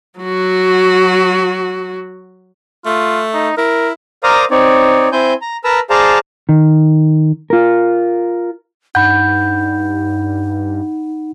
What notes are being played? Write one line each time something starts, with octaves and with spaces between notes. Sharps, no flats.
F#3 F#4
A3 F4
D#4
E4 A#4
A#4 C5 D5 F5 A#5 D#6
C4 D#4 C#5 D5
C4 E4 C5 G#5 G6
A#5
A#4 B4 A5 A#5 E6
G#4 C5 D5 F5 A5 A#5
D#3
F4 A#4
G2 D#4 F#5 B5 G6